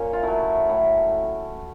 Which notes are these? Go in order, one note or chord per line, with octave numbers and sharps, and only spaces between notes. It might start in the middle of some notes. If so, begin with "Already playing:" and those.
Already playing: A#2 C#4
F4
F#3 A3 E4
A2